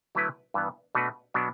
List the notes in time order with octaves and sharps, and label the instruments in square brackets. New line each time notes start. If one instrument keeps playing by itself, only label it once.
[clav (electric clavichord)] D3 F#3 A3 E4 B4
G2 E3 B3
B2 A3 D4 F#4 B4
B2 F#3 B3 D4